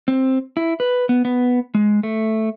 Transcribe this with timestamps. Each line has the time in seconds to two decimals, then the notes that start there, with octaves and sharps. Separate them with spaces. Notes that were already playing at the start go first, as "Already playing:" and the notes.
0.08 C4
0.57 E4
0.80 B4
1.09 B3
1.25 B3
1.75 G#3
2.03 A3